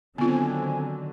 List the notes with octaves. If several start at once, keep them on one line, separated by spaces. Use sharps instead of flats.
D3 D#3 F#3 B3 C4 F4 G#5